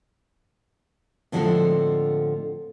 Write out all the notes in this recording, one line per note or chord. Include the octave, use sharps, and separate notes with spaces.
A2 D3 F3 G#3 C4 A4